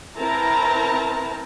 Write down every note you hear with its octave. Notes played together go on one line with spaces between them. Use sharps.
C4 E4 A#4 B4 A5 A#5